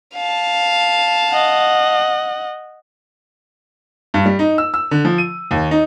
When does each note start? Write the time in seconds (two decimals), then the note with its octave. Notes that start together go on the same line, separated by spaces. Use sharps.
0.15 F5 A5
1.30 D#5 F#5
4.14 G2
4.26 G3
4.39 D#4
4.58 E6
4.74 E6
4.91 D3
5.05 F3
5.18 D#7
5.51 D#2
5.71 D#4